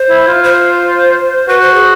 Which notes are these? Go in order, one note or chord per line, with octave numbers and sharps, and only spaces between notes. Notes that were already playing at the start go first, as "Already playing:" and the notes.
Already playing: C5
E4
F4
C5
F#4 B4
C5
G#4